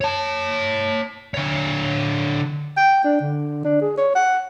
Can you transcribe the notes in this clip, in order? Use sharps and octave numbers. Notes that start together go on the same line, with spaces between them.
C#5 A5
D3 C#5
G5
D4
D3
D4
G#4
C#5
F#5